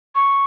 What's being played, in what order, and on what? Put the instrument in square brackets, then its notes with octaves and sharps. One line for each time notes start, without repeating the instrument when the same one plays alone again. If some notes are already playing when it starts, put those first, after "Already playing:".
[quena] C#6